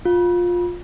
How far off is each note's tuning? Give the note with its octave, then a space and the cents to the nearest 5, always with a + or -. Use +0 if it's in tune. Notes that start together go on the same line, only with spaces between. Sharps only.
F4 +15